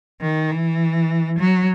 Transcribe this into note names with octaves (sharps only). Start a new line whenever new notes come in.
D#3
E3
F#3